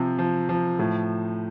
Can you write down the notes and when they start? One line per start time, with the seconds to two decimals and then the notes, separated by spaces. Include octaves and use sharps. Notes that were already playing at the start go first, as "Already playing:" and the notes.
Already playing: C3 F3
0.19 F3
0.49 F3
0.79 A2